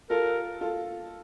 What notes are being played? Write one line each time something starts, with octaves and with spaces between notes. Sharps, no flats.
F4 A4 A#4
F4 A4